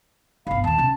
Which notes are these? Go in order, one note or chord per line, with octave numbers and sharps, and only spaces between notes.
G1 C2 F5 B5
D#2 A#2 A5
C3 C#4